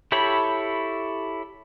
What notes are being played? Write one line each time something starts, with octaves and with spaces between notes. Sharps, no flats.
E4 G4 A4 C#5 B5